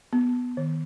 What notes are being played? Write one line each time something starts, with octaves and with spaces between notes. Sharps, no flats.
B3
D#3